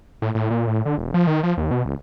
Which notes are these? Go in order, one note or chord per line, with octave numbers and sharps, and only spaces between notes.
A2
A2
A#2
A2
D3
E1
F3
D#3
F3
D#2
B2
C#2